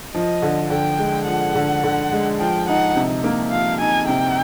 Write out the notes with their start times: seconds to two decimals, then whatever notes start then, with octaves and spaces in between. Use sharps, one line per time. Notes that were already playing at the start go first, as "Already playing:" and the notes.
0.14 F3 D#5
0.42 D3
0.70 D3 G5
0.99 G#3
1.27 F3 F#5
1.55 D3
1.84 D3
2.12 G#3
2.39 F3 G5
2.68 D#4 F#5
2.96 C3
3.24 A#3
3.52 F3 F5
3.81 D#4 G#5
4.08 C3 G5